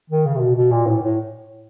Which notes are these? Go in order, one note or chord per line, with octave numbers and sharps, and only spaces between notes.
D#3
C#3
C3
B2
B2
A#2
A2
A2